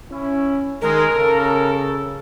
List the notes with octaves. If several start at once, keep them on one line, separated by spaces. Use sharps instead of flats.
C#4 E4
D#3 G#3 A#4
C#3 A4